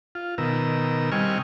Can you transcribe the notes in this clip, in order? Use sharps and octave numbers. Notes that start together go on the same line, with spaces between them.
F4
B2 D#3 A#4 E6
C3 G3 D#5 G#5 C#6 F6